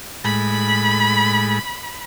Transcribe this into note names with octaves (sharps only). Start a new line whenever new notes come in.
A2 G#3 B5